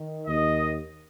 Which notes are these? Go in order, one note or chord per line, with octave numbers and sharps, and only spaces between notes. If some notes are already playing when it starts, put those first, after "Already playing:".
Already playing: D#3
D#2 D#3 D#5